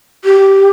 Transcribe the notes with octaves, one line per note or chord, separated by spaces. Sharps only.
G4